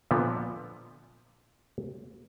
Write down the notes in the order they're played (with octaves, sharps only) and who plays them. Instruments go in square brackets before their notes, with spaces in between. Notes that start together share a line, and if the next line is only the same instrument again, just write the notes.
[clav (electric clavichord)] A#2 D3 F3 B3